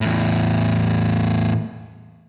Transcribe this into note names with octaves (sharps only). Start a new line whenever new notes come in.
E2 A2